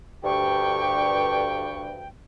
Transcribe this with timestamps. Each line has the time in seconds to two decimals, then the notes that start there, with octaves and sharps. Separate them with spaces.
0.24 D2 G2 G4 G5 C#6